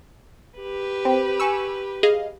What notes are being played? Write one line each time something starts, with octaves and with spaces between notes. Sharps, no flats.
G4 B4
C4
G#5 C#6 E6
G#4 D#5 F5